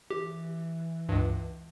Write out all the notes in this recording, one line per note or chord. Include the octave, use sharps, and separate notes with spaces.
E3 G4
C#2 G2